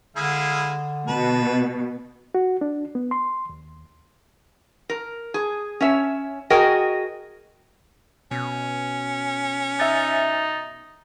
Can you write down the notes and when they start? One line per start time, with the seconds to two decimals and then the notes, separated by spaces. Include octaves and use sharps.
0.16 D3 G#3 E4 F5
1.08 B2 B4 A5
2.35 F#4
2.61 D4
2.95 B3
3.11 C6
3.49 D#2
4.90 A#4
5.34 G#4
5.81 C#4 C#5 E5
6.50 F#4 G#4 A#4 D#5 G5
8.31 B2 C#4
9.80 D#4 E5 A6